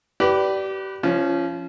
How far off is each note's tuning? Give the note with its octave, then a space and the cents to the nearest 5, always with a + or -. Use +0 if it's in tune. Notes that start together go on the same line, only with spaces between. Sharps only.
G4 -30 B4 +0 D5 +0
F3 -25 C#4 +0